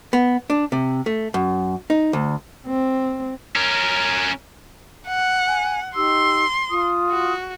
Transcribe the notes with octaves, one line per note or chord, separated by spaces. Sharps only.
B3
D4
C3
A3
F#2
D#4
D2
C4
C#4 A#4
F#5
G#5
D#4 G4 C6 E6
F4 D#6
F#4